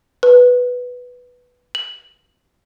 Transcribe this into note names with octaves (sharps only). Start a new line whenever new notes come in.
B4
F#7